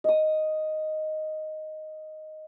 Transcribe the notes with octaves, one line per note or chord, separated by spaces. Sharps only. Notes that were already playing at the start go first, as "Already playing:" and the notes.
D#5 D#6